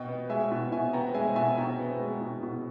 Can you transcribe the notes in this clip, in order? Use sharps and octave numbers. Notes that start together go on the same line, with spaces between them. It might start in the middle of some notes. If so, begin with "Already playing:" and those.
Already playing: B2 D#5 G5
B3
G#3 E5 G#5
B2
B2 E5 G#5
B3 G5 A#5
G#3 E5 G#5
B2 E5 G#5
B2 G5 A#5
B3
G#3
B2
B2